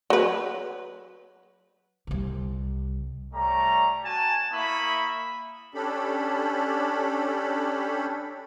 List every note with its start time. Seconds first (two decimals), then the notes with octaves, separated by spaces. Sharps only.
0.10 F#3 B4
2.07 C2 C3
3.34 G3 A3 C#5 A#5
4.04 F#4 G#5 A5
4.52 A#3 E4 E5 B5 C#6 D#6
5.74 C#4 D4 G4 A4 B5